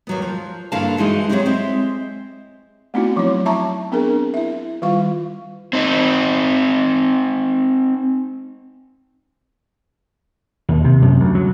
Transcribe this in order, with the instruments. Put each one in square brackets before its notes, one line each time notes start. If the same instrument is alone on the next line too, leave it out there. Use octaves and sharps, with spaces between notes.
[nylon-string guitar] D#2 F#3 B3
F3
G2 D3 A#3 E4 F5 A5
G2 E3 G#3 D#4 F#4
F#3 G#3 C4 D#4 E4 G4
G#3 C4 E5
[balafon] A3 B3 C4 D#4 E4 F#4
F3 F#3 D#4 E4 C#5
E5 A5 A#5 C#6
B3 C4 D4 G#4 A#4
E4 E5
D#3 G3 F4 F5 C#6
[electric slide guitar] C4 D#4
[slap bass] D#2
C3
F#2
D2
F#3